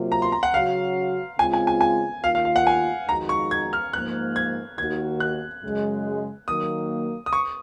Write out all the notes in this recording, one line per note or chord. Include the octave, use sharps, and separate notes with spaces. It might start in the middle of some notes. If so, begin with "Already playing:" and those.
Already playing: C3 F#3 A#3 F4
A#5
C6
A#5
F#5
C#3 F#3 C#4 F#4 F5
C#3 G#3 C4 F4 G#5
G#5
G#5
G#5
D#2 D#3 A#3 F4 F5
F5
F5
F#5
G#5
F2 D#3 G#3 D#4 F#4 A#5
C#6
G#6
F6
G#2 F3 A#3 F#6
G#6
D#2 D#3 A#3 D#4 F#4 G#6
F#6
F#2 C#3 G#3
D#3 F#3 A#3 D#6
D#6
C#6